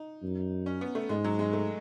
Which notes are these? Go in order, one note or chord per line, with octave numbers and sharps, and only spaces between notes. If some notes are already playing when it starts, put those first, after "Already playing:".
Already playing: D#4
F#2
C#4
B3
A3
G#2 G#3
F#3
G#3
A3